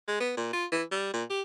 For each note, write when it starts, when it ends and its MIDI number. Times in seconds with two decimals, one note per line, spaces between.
0.08 0.19 56
0.20 0.33 59
0.37 0.49 46
0.53 0.66 65
0.72 0.84 52
0.91 1.13 55
1.14 1.24 46
1.30 1.42 67